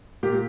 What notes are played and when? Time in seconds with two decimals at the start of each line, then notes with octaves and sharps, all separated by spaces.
0.23 A#2 G4